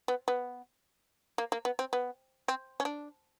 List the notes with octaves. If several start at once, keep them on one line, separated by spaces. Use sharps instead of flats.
B3
B3
A#3
A#3
B3
C4
B3
C4
C#4
D4